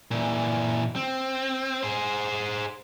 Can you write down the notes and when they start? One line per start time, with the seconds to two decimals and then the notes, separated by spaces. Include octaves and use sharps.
0.11 A#2 E3
0.96 C4
1.83 G#4 C5